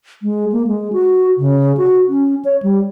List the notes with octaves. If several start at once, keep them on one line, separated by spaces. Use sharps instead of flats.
G#3
A#3
G#3
F#4
C#3
F#4
C#4
C#5
G3